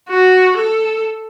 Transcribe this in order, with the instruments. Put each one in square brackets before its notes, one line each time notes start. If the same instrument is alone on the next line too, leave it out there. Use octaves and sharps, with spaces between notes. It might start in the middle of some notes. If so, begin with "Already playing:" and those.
[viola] F#4
A4